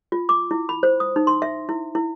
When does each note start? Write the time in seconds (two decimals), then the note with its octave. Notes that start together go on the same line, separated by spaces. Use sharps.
0.12 F4
0.29 D6
0.51 E4
0.69 B5
0.83 C5
1.00 D#6
1.16 D#4
1.27 C6
1.42 E5
1.69 E4
1.95 E4